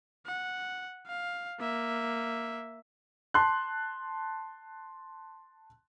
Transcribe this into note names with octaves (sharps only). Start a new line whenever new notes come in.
F#5
F5
A#3 E5
A5 C6 F#6